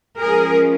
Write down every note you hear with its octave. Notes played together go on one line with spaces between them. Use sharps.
F3 G#3 C#4 G#4 A#4